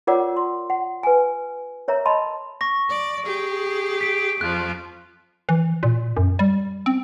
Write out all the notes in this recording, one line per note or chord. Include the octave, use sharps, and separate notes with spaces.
F4 A#4 C#5 D5 F#5 D6
C6
F#5
B4 G#5
A#4 C#5 E5 A#5
D#5 A5 B5 C6
C#6 A#6
D5
G4 G#4
B6 D7
F2 F3 F#6
E3
A#2
F#2
G3
C4